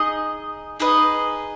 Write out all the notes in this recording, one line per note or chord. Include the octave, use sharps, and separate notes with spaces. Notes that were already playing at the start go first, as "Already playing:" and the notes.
Already playing: D#4 G#4 D#5
D#4 G#4 B4 D#5